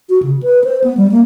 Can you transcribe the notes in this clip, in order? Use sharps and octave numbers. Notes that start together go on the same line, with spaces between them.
F#4
C#3
B4
C5
B3
G3
A#3